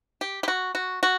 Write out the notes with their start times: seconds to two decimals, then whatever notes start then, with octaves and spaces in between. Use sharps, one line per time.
0.21 G4
0.43 G4
0.48 F#4
0.75 F#4
1.03 F#4